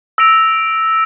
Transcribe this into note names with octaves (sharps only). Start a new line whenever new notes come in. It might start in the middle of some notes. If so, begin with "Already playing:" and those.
E6 A#6 D7 F7